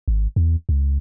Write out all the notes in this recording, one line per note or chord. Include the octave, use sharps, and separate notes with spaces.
G#1
E2
C#2